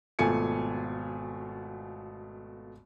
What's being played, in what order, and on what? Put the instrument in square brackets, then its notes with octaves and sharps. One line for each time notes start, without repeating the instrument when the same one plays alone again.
[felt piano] G#1 B2 A3 F4 G#5 C#7